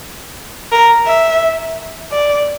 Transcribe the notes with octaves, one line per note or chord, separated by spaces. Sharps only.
A#4
E5
D5